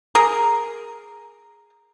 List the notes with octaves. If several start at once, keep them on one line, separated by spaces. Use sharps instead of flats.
G#4 A#4